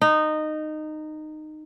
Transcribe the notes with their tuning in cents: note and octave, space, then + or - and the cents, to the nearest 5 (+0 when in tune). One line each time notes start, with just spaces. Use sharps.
D#4 -15